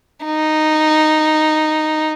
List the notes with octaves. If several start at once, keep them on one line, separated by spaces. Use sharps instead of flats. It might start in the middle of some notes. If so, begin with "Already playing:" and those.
D#4